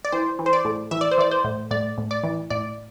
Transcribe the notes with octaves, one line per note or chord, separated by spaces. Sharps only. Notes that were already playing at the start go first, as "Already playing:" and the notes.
D5
E3 C5
E3
C5
D5
A2
E3 E5
D5
C5
E3 D5
C5
A2
A2 D5
A2
D5
E3
A2 D5